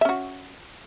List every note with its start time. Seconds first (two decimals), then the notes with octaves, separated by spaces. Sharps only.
0.01 E5
0.05 C#4
0.09 F#4